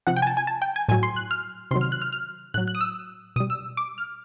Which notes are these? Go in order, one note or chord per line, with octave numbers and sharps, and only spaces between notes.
C3 F3 F#5
G5
G#5
A5
G#5
A5
G5
G#5
A2 F#3 G#5
C6
F#6
F6
C3 D#3 F#3 C6
F6
F#6
F6
F6
A2 F#3 F#6
F#6
D#6
E6
B2 G3 D#6
E6
D6
F6